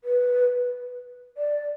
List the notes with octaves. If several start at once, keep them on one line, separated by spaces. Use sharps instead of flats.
B4
D5